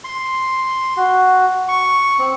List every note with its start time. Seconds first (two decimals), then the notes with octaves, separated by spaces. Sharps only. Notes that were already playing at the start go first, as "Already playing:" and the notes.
0.04 C6
0.97 F#4
1.68 C#6
2.19 C4